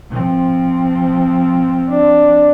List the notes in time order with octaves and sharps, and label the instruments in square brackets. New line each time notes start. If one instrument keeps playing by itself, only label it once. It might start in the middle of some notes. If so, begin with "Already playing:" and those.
[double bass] F3 C4
[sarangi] D4